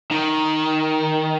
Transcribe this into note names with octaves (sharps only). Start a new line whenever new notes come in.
D#3